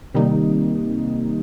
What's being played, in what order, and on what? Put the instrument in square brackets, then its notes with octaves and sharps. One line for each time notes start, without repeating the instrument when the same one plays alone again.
[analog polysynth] C3 D#3 G3 A#3 D#4